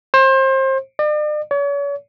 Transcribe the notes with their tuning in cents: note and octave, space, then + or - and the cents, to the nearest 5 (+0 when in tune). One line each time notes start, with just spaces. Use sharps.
C5 +30
D5 +45
C#5 +40